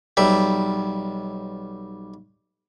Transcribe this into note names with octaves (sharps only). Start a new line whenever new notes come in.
B1 G3 E5